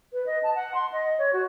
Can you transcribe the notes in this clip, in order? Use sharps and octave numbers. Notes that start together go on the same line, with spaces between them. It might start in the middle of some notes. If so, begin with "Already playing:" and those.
B4
D#5
A5
F#5
C6
D#5
C#5
F#4